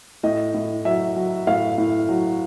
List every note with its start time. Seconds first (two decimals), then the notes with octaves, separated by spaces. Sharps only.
0.23 A2 D#5
0.54 A2
0.85 F#3 E5
1.16 F#3
1.47 A2 F5
1.78 A2
2.09 F#3